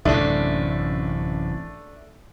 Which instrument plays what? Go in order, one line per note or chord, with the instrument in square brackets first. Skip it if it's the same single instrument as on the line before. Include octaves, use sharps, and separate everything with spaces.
[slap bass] A1 F#2 C3 [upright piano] A3 D4